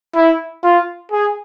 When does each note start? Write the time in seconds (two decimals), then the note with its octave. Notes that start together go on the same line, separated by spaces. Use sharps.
0.15 E4
0.64 F4
1.12 G#4